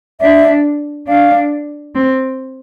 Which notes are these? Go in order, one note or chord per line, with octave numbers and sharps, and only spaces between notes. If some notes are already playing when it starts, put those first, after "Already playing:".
D4 E5
D4 F5
C4